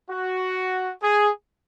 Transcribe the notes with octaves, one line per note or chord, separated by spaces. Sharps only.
F#4
G#4